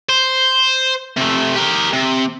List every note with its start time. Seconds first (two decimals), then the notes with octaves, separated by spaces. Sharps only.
0.09 C5
1.17 C3 A3
1.56 G4 A#4
1.93 C3